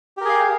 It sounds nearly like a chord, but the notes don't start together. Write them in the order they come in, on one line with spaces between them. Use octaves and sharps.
G4 A#4 G#4 F5